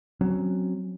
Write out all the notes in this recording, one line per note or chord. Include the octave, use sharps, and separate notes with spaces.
F#3 C4 C#4